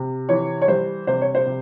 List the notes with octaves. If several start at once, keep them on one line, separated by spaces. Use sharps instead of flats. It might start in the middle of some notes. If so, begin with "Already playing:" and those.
Already playing: C3
E3 C#5
C#5
G3 C5
C3 C5
C#5
C5
C3